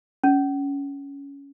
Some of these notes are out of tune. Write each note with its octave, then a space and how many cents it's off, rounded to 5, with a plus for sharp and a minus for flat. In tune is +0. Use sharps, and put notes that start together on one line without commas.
C#4 +15